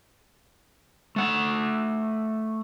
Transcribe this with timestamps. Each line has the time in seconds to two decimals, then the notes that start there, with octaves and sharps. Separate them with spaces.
1.16 A3 F#5